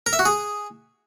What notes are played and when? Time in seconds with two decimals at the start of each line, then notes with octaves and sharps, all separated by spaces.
0.06 A#4
0.13 E5
0.19 F#4
0.25 G#4